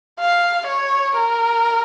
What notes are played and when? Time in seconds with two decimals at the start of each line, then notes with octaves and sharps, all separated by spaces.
0.20 F5
0.67 C#5
1.16 A#4